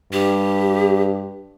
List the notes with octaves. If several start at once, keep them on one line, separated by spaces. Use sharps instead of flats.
G2 G4